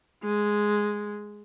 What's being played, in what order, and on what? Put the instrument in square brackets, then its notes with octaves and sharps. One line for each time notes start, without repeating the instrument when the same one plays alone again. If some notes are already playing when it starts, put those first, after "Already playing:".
[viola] G#3